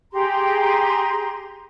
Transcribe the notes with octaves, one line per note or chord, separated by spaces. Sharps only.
G4 G#4 A#5 C6